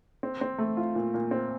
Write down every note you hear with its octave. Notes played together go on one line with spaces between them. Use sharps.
C4
C4
A3
F4
A#2
A#2
C4